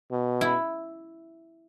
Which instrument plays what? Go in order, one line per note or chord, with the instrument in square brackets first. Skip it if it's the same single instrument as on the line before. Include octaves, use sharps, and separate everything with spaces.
[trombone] B2
[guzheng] E4